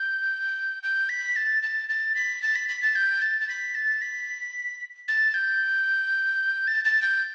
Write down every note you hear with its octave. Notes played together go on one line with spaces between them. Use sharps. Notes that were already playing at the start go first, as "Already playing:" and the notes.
Already playing: G6
G6
B6
A6
A6
A6
B6
A6
B6
B6
A6
G6
A6
A6
B6
A6
B6
A6
G6
A6
A6
G6